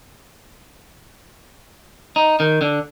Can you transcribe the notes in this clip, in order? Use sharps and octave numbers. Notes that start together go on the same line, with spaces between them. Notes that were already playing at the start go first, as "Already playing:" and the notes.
D#4
D#3
D3